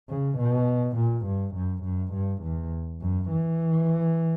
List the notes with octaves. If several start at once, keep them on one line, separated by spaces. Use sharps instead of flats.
C#3
B2
A#2
G2
F#2
F#2
G2
E2
F#2
E3